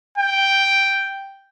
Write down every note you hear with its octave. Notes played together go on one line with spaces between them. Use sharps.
G5